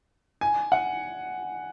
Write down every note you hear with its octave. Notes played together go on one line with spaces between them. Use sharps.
G#5
F#5